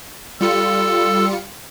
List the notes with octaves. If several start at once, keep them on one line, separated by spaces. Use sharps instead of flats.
G3 F4 A4 C#7